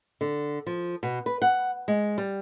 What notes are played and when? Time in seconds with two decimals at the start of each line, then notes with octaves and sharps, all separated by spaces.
0.21 D3
0.66 F3
1.03 B2
1.26 B4
1.42 F#5
1.88 G#3
2.18 G3